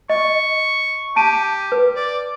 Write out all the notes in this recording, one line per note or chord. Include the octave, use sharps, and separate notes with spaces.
D#5 C#6
G4 A5 D7 D#7
B4
D5